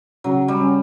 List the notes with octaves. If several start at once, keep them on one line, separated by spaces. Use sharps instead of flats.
C#3 F#3
G3
C#4